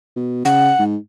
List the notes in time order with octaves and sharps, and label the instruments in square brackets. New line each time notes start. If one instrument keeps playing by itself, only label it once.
[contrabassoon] B2
[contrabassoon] C#3 [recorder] F#5
[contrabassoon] G#2